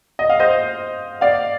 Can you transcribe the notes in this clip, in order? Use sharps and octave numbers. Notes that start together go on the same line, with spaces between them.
D#5
F5
C5 D#5
D5 F5